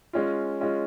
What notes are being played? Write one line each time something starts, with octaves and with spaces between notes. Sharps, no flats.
G#3 C#4 F4
G#3 C#4 F4